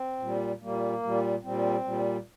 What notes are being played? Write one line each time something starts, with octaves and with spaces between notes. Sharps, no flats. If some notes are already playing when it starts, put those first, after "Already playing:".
Already playing: C4
A#2 G3
A#2 G3 A#3
A#2 G3
A#2 G3 C4
A#2 G3